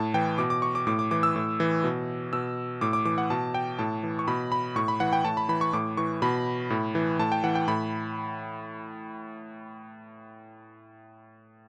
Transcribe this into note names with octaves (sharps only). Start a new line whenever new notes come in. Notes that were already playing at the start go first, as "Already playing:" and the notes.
Already playing: A2 A5
E3 G5
B2 D6
D6
C#6
D6
A2 D6
D6
E3 D6
E6
A2
E3
B2
B2 E6
A2 D6
D6
E3 D6
F#5
B2 A5
G5
A2 A5
E3
C#6
B2 B5
B5
A2 C#6
B5
E3 F#5
G5
A2 A5
B5
E3 B5
C#6
A2 D6
E3 C#6
B2 B5
A2
E3
A2 A5
G5
E3 F#5
G5
A2 B5